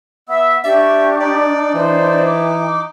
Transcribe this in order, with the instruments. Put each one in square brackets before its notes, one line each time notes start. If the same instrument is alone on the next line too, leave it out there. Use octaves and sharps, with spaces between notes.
[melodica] B3 [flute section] E5 E6
[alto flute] D4 [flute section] G4 C#6 [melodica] D5 [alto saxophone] E5
[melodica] D#4 [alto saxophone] D5
[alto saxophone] E3 [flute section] C5 D5
[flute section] D6